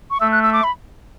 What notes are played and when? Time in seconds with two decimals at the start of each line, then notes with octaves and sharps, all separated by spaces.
0.11 C#6
0.20 A3 E6
0.32 F#6
0.42 E6
0.53 D6
0.64 B5